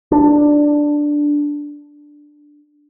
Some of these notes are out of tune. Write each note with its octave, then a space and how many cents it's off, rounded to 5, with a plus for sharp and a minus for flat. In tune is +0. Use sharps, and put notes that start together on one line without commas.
D4 +5